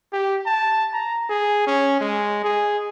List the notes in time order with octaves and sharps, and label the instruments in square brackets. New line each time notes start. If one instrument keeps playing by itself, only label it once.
[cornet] G4
A5
A#5
G#4
C#4
G#3
G#4